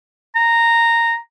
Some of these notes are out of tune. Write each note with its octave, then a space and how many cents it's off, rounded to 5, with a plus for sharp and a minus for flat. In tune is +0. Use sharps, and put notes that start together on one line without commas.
A#5 -10